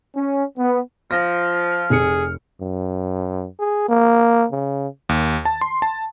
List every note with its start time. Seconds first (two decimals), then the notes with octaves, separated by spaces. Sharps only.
0.15 C#4
0.56 B3
1.11 F3 F6 A#6
1.90 F1 G#4 C#7
2.61 F#2
3.60 G#4
3.89 A#3
4.52 C#3
5.09 D#2
5.45 A5
5.61 C6
5.82 A5